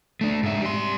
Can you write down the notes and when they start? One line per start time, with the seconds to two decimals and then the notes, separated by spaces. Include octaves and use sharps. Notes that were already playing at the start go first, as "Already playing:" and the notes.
0.21 A3 D4
0.43 G#2 E5
0.61 G3 C6